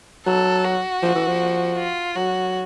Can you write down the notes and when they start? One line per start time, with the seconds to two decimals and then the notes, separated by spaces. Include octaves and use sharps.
0.26 F#3 A4
0.65 F#4
1.02 F3
1.15 E3
1.27 F3
1.77 F4
2.16 F#3 F#4